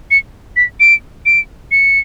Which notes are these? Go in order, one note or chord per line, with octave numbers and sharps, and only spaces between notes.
C#7
B6
D7
D7
C#7